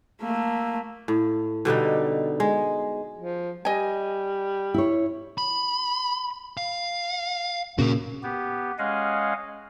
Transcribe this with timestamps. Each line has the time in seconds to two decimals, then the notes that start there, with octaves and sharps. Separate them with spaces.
0.21 A3 A#3
1.08 A2
1.65 B2 D3 G3 D#4
2.40 G#3
3.18 F3
3.65 G3 D#5 G#5
4.74 E4 C#5
5.38 B5
6.57 F5
7.79 A#2 C#3 F#4 A#4
8.23 B3 G4
8.79 G#3 C#4 D#5 F5 F#5 G#5